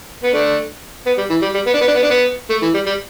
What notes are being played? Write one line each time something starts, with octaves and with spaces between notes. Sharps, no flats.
B3
A3 D4
B3
G3
E3
G3
G3
B3
D4
B3
D4
B3
D4
B3
A3
E3
G3
G3